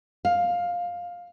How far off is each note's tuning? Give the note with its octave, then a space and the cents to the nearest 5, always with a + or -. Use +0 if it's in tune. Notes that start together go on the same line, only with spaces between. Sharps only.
F5 +10